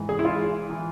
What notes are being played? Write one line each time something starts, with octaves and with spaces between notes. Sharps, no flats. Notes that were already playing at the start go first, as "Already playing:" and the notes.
Already playing: G#2 E3
G#4
E4
F4
E3